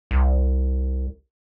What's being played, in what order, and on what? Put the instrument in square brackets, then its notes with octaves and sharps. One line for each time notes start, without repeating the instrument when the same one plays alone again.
[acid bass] C2